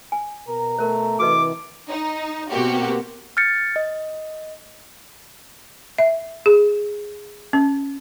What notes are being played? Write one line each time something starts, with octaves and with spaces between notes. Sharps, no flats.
G#5
B2 A#4 A#5
A3 A#4 C5
C3 E3 F#4 B4 D#5 D6
D#4
B2 A#3 C4 F#4 G4
F6 G6 A6 C#7
D#5
E5
G#4
C#4